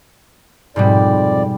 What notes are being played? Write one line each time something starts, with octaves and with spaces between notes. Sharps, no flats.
F2 G#2 B2 G3 D5